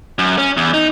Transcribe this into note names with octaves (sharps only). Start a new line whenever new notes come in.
F#2
C#4
E2
D#4